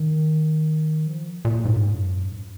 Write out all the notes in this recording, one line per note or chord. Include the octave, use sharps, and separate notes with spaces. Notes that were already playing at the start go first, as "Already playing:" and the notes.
Already playing: D#3
F3
A#2
G#2
F#2